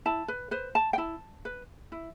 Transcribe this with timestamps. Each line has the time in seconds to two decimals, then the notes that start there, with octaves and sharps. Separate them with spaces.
0.05 E4 A5
0.28 B4
0.51 B4 C5
0.75 A5
0.93 G5
0.98 E4 A5
1.45 B4
1.92 E4